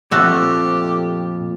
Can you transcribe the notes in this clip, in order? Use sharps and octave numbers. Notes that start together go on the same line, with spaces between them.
F2 A#2 F3 A3 F#4 G4 A4